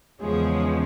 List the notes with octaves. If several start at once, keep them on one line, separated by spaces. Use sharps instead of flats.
E2 C#3 F3 G#3 C#4 G#4